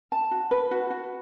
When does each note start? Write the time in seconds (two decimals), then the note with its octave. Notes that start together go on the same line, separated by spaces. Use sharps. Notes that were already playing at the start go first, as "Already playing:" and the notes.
0.12 A5
0.31 F#4
0.51 B4
0.71 F#4
0.90 F#4